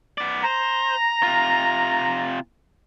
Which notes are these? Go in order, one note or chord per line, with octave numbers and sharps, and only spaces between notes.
B3 D5
C5 A#5
C3 F4